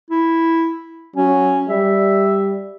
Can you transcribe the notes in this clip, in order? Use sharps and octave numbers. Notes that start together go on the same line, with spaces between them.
E4
F#3 C#4
G3 E5